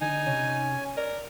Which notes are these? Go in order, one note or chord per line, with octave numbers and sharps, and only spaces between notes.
D3 D#4 G#5
C3 C#4
A#4 D5